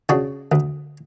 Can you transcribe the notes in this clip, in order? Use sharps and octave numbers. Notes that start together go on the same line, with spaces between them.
C#3 D4 F#4
D2